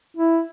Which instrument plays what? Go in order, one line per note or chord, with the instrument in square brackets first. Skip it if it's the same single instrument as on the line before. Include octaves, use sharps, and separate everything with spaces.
[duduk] E4